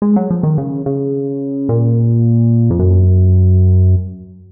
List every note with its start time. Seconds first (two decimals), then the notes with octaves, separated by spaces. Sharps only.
0.02 G#3
0.16 F#3
0.31 F3
0.43 D#3
0.58 C#3
0.86 C#3
1.69 A#2
2.70 F2
2.79 F#2